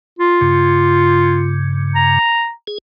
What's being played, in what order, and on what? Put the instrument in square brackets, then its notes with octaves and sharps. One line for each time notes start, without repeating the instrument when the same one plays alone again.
[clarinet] F4
[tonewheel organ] G2 C#3
[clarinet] A#5
[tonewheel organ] G#4